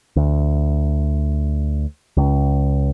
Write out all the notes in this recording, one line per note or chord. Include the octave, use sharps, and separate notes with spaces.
D2
C#2